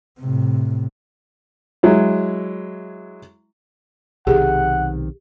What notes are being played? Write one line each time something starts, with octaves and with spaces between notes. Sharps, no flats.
A2 C3
F#3 G#3 E4
B1 C3 D#3 G4 G#4 F#5